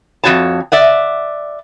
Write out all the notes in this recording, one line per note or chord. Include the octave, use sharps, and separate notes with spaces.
F2 G#3 F#4 C#5 A5
D5 E5 F#5